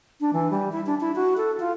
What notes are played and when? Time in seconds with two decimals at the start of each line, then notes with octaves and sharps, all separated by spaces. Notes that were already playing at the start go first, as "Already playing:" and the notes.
0.21 D4
0.33 E3
0.51 G3
0.72 E4
0.86 D4
1.00 E4
1.16 F#4
1.37 A4
1.60 F4